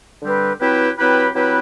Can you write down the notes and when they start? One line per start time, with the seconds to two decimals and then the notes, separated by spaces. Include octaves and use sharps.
0.22 D3 G3 C4 G4 B4
0.59 F#3 C4 E4 G4 B4
0.98 F#3 C4 E4 G4 B4
1.35 F#3 C4 E4 G4 B4